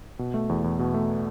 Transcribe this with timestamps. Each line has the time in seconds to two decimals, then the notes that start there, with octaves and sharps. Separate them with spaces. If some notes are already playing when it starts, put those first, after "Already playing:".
0.19 B2
0.34 A3
0.49 E2
0.64 E2
0.79 B2
0.94 A3